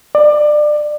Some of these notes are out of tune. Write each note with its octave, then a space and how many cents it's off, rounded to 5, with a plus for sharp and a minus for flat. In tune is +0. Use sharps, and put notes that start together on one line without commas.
D5 +25